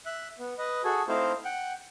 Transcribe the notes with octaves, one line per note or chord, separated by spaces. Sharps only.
E5 F#6
B3
B4 D#5
F#4 G#4 A4 G#5
A3 C4 D#4 E4 C5 F5
F#5 G5